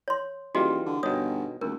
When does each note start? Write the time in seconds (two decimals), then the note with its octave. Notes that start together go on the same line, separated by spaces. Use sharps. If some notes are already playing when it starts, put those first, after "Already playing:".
0.08 C#5 C6
0.55 D#1 E3 G3 F4 F#4 G#4 D#5
0.86 D3
1.03 G1 B2 D#3 C#5 D#6
1.61 D#1 D2 A#4